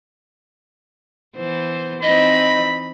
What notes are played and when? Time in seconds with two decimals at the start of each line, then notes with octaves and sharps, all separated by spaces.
1.37 E3 B3 C5
2.03 E3 C4 D#4 D#5 B5